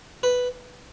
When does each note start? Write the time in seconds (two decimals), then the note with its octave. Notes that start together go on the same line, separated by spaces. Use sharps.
0.23 B4